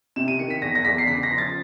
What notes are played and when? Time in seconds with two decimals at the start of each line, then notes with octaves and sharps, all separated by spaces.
0.16 C3 E7
0.28 D#7
0.39 D#3 C#7
0.50 B6
0.62 E2 A#6
0.75 A#6
0.85 E2 B6
0.98 C7
1.08 C#3 B6
1.23 A#6
1.30 F3
1.38 A6